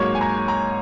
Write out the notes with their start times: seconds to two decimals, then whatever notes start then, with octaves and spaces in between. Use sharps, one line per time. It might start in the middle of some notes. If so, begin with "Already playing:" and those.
Already playing: G#2 F#3 A#3 C#5
0.15 G#5
0.21 A#5
0.48 A#5